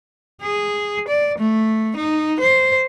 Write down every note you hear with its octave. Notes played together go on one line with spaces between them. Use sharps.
G#4
D5
A3
D#4
C5